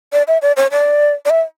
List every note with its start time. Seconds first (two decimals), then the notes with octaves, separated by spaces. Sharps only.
0.13 D5
0.28 E5
0.42 D5
0.57 C#5
0.72 D5
1.25 D5
1.30 E5